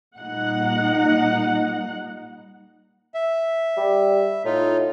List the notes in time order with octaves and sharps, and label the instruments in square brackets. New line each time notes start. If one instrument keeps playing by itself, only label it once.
[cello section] A#2 G3 D#4 [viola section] F#5
[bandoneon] E5
[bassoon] G3
[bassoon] A2 [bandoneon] D#4 F4